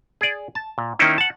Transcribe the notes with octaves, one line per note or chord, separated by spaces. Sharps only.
G#4 D5
A5
A#2
D#3 A#3 C#4 D#4 E4
F#5 A5